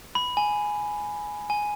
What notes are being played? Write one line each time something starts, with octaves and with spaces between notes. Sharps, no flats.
B5
G#5
G#5